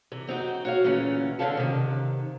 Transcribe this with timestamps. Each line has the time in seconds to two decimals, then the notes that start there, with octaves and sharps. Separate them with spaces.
0.12 C3 E3
0.27 F#2 C4 D#4 F#4
0.65 F#4 C#5 F5
0.84 D2 A#2 C#3 E3 C#4
1.39 G#2 D3 C4 C#4 F5 A5
1.57 C3 D#3